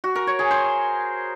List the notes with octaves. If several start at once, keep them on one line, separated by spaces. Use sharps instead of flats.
F#4
A#4
C#5
G#4
C5